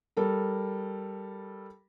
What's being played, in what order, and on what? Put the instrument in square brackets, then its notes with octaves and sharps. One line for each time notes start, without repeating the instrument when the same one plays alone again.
[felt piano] G3 A4 A#4